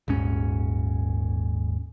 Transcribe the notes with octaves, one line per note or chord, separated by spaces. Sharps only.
D#1 G#1 G#2 C#4